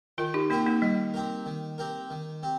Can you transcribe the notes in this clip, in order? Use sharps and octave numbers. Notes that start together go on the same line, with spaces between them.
D#3 F4 A#4
D#4 G4
A#3 C4 D#4 G4 A#4
A#3 D#4
D#3 G3
C4 G4 A#4
D#3
C4 G4 A#4
D#3
C4 G4